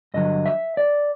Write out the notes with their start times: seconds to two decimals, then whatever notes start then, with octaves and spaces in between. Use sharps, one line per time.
0.14 G2 D3 F#3 D#5
0.46 E5
0.77 D5